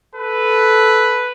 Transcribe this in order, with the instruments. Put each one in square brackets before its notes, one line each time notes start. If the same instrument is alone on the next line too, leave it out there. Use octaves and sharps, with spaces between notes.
[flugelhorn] A4 [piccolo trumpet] B4